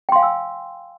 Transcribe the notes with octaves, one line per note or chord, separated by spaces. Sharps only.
F5 G5 G#5 C6 E6